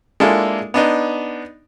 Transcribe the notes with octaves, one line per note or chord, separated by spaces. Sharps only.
G#3 A#3 D4 E4 F4 A4
B3 D4 D#4